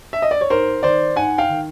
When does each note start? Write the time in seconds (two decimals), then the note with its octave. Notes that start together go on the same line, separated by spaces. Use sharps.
0.13 E5
0.22 D#5
0.31 D5
0.41 C#5
0.50 G#2 A#4 C5
0.83 D#3 C5 D5
1.16 G#2 F#5 G#5
1.38 F5 G5
1.49 D#3